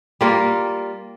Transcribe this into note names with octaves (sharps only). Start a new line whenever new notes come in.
G3 A#3 F4 A#4